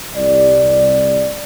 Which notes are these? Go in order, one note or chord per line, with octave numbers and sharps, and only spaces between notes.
C2 D5